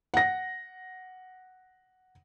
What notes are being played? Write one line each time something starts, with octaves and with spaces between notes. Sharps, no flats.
F#5 A#6